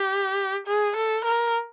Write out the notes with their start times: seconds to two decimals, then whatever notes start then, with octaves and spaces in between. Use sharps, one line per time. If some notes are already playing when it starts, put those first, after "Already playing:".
Already playing: G4
0.67 G#4
0.97 A4
1.25 A#4